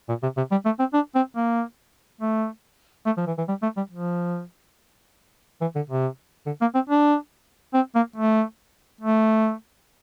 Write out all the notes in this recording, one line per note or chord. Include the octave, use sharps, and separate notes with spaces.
A#2
C3
C3
G3
A3
C4
D4
C4
A#3
A3
A3
F3
E3
E3
G3
A3
G3
F3
E3
D3
C3
D3
A#3
C4
D4
C4
A#3
A3
A3